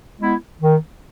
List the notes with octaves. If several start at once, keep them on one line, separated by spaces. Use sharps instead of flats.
G#3 B3 E4
D#3